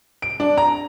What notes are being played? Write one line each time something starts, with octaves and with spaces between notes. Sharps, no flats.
D7
D4
A#5